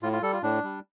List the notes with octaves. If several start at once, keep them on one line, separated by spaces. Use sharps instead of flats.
A2 F4
F4
G3 A4
F4
A2 D4
G3